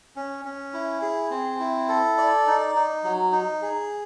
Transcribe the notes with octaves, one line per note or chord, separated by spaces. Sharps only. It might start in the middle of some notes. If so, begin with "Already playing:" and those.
C#4
C#4
E4
G#4
C4
E4
A4
D5
D#4
D#4
F#3
D#4
G#4